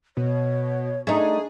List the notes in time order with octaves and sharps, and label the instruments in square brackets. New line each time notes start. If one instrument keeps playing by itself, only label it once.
[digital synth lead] B2 [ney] C#5
[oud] A3 D#4 [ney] D4 [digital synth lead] G#4